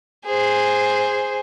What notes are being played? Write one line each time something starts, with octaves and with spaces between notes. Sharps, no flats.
G#4 C5